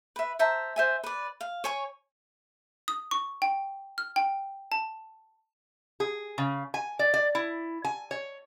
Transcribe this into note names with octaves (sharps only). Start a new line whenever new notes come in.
B4 E5
C5 E5 A5 A#5
C5 E5 G#5
B4 D5
F5
C#5 G#5 C#6
D#6
C#6
G5
F6
G5
A5
G#4
C#3
G#5
D5
D5
E4
G#5
C#5